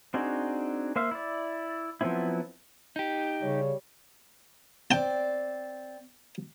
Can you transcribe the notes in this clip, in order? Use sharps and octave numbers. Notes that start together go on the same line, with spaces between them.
C4 D4 D#4 F#4 G#4
A#3 C5 E5 F5
E4 D5
F3 F#3 B3 C4 E4
D#4 G4
C#3 G3 C#5
C4 D5 G5 A5